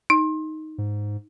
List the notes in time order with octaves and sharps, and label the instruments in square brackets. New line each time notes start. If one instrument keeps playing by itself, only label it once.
[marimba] D#4
[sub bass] G#2